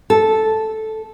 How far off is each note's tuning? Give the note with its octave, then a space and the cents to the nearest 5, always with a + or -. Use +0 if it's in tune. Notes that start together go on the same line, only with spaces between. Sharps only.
A4 -5